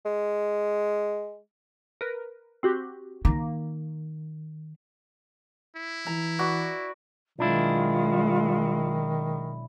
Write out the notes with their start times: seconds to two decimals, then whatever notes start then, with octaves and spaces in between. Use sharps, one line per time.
0.05 G#3
2.01 A#4 B4
2.63 C4 F#4 G4
3.25 D#3 A#3
5.76 E4
6.06 E3 A#5
6.39 F#4 B4 D5
7.39 B1 D#3 G#3 D4 E4 F4